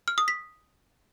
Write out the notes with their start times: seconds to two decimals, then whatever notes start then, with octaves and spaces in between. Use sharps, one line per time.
0.08 F6
0.18 D#6
0.28 B6